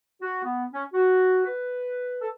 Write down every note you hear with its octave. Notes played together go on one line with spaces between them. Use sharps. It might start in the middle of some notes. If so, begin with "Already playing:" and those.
F#4
B3
C#4
F#4
B4
A4